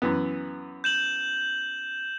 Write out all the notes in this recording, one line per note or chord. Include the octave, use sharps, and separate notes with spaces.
F#2 E3 B3
G6 E7 F#7